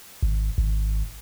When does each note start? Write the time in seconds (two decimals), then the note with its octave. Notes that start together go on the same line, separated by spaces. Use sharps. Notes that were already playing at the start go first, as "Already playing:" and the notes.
0.23 G#1
0.58 G#1